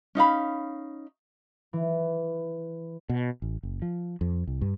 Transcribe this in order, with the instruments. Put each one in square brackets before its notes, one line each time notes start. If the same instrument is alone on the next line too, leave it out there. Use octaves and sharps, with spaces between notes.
[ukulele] C#4 D#4 F5 B5
[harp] E3
[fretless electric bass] B2
A1
F#1
F3
F2
C2
G2